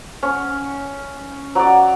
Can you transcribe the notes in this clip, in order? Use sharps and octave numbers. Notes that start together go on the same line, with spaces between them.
C#4
F#3 D5